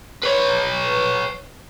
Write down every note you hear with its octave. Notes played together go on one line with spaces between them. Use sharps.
B4 C#5